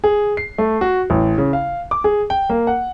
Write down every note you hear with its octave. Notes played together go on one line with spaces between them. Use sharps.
G#4
C7
A3
F#4
A1
C#3
F5
D6
G#4
G5
A#3
F#5